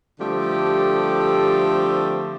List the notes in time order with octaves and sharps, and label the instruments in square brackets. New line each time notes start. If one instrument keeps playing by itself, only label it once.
[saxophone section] D3 F3 G3 A3 C4 G4